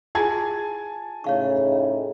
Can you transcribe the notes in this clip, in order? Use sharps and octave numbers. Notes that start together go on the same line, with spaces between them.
E4 F4 G#4 G#5 A5 G#6
A2 C#3 D#4 C#5 F5 C#6